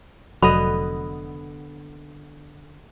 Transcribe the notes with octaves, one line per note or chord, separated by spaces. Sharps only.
F1 D3 F#3 B3 D#5 B5